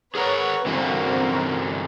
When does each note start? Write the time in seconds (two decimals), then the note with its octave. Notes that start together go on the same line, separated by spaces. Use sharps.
0.15 G#4 A#4 B4 C#5 F#5 A#5
0.66 G2 D3 E3 C4 F#4 A#4